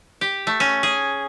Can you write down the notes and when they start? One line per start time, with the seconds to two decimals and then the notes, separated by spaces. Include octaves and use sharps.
0.21 G4
0.47 A3
0.60 C#4
0.83 G#4